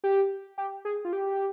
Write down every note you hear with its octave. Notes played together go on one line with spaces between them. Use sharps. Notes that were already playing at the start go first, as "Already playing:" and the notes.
G4
G4
G#4
F4
G4